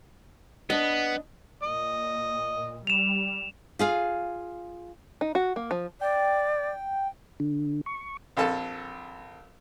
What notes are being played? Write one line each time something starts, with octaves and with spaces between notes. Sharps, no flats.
B3 D4 D#5
A#2 D#5
G3 E7 F7
F4 G#4 F5
D#4
F#4
A#3
F3
D5 G5
D3
C#6
A#1 F2 A4 A5